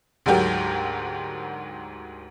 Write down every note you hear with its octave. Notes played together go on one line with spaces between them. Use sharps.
D2 G#2 F#3 G4 A#4